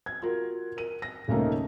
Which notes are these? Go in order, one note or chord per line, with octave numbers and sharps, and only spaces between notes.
G#6
F4 F#4 A#4
A#4 D#7
A#6
D#1 C#3 A3 A#3 D#4